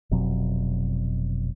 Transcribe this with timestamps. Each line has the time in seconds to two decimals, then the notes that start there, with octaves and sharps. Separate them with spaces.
0.11 F1 B2 F#3 C4